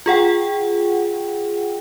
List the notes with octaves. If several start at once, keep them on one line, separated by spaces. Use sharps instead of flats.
F4 G#4 F#5 G5